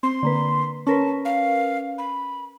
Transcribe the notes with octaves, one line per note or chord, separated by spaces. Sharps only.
C4 C6
D3 A#3 B4
C#4 A#4 B4 A5
F5
B5